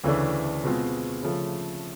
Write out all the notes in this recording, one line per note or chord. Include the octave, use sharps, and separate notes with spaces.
D2 C#3 E3 A3 D4
B2 G#3 C4 F4
C#3 F3 A3